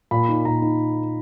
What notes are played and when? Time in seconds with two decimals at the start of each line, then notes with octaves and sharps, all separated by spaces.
0.11 A#2 B5
0.29 D#4
0.45 A#2 A#5
0.62 D#4